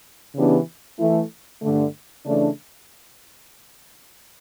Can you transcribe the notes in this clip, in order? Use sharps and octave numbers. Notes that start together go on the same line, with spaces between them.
C#3 E3 B3 D4 G4
E3 A3 E4
G2 D3 A3
C#3 E3 A3 D4